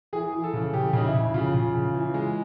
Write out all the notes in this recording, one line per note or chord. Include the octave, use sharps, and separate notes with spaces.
E3 G#4
E3
A4
C#3
C#3 G4
C#3 D#4
E4
C#3
C#3 F4
C#3
C#3
E3
G#3